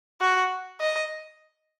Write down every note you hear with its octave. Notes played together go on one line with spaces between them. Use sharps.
F#4
D#5